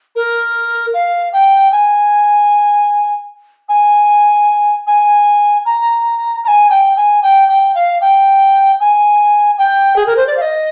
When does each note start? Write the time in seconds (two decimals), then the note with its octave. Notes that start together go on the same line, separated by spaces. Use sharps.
0.15 A#4
0.93 F5
1.32 G5
1.72 G#5
3.68 G#5
4.87 G#5
5.65 A#5
6.44 A#5
6.47 G#5
6.70 G5
6.96 G#5
7.22 G5
7.48 G5
7.75 F5
8.01 G5
8.80 G#5
9.58 G5
9.96 G#4
10.06 A#4
10.16 C5
10.27 D5
10.36 F5
10.41 D#5